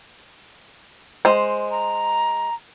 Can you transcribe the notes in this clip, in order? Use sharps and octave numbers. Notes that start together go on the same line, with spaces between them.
G#3 C5
A#5